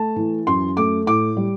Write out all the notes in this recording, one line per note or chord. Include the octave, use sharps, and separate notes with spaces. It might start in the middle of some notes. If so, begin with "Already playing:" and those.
Already playing: A3 A5
E3
F#2 C6
A3 D6
A2 D6
G3